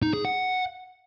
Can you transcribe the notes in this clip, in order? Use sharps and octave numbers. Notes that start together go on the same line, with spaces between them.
D#4
G#4
F#5